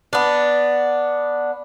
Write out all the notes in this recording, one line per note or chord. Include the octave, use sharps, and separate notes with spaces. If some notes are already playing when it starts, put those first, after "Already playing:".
B3 D4